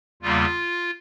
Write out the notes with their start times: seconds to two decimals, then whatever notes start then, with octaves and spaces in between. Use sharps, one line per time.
0.22 E2 C#3 G3 A#3 F4